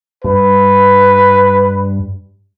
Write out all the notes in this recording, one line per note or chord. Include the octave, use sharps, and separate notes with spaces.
G2 B4